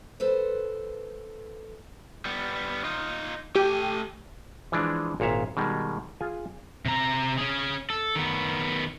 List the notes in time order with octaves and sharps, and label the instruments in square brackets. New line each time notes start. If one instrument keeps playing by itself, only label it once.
[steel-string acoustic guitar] A4 B4 C5
[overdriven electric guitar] G3 B3
D#4 F4
[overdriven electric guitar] A3 G#5 [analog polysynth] G4
[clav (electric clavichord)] E3 F3 G#3 D4
G#1 A#2 C#5 E5 F5
B2 D#3 G3 G#3
F4 G#4 G#5
[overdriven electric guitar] C3 A#5
C#4 G#4
A4
D#3 B3